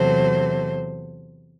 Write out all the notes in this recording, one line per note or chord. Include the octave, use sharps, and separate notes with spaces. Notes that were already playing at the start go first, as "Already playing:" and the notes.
Already playing: E2 C3 F#3 A3 C5